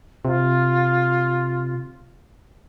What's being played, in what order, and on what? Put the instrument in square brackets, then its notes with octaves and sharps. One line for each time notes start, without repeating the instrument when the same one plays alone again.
[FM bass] C3 [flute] F4